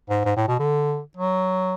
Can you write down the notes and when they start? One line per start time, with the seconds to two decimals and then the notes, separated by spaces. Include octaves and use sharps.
0.09 G#2
0.25 G#2
0.36 A2
0.48 B2
0.59 D3
1.17 F#3